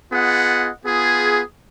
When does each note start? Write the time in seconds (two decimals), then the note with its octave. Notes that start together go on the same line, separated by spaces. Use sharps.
0.12 B3 F4 G#4 D#5 F#5
0.84 B3 F4 G#4